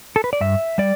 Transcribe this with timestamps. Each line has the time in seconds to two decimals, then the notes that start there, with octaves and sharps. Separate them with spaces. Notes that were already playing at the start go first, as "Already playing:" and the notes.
0.16 A4
0.24 B4
0.33 D5
0.41 G2 E5
0.78 G3 D5